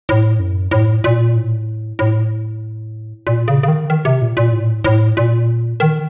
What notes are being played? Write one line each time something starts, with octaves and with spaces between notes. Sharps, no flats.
A2
F#2
A2
A#2
A2
A2
A#2
C#3
C#3
D#3
D#3
C3
A#2
A#2
A2
A2
A#2
D#3